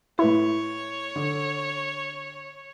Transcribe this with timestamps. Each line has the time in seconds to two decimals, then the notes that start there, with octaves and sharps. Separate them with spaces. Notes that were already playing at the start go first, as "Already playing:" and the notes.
0.19 A2 E4 B4 C#5 B5
1.16 D3